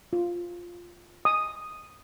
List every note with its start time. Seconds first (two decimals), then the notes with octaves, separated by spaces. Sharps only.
0.13 F4
1.25 D#6